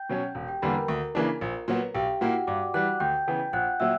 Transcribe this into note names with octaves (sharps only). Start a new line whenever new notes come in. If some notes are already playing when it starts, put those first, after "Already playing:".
Already playing: G5 G6
B2 F#3 C#4
E1
G4 G5
E2 D3 G3 A#3 B4 B5
A#4 A#5
D2
C#3 E3 A#3 D4
A#1
A#2 F#3 B3
B1 G4 G5
A#2 A#3 E4 F#4 F#5
G2 D5 D6
E3 G3 F#5 F#6
D2 G5 G6
C#3 E3 B3
A#1 F#5 F#6
A#2 F#3 E5 E6